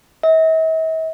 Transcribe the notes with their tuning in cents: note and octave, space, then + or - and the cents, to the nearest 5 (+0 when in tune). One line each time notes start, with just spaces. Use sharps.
E5 -45